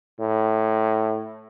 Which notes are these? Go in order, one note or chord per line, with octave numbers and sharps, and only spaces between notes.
A2